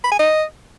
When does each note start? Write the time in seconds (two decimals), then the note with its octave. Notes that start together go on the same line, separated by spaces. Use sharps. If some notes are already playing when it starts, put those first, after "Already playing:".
0.04 B5
0.12 G#5
0.19 D#5